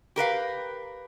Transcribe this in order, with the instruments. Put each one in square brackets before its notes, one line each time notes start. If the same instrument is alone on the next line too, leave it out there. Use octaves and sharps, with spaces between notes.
[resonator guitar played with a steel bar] G4 A#4 B4 F5